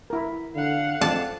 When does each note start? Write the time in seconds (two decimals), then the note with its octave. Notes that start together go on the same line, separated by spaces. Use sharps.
0.10 E4 A#4
0.55 D3 F5 F#5
1.01 F2 D5 A5